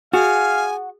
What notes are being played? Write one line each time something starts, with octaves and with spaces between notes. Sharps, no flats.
F#4 G#4 F5 G#5